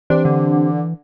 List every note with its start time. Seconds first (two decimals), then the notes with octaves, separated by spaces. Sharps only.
0.10 E3 C4 D4 G4 C5
0.25 D3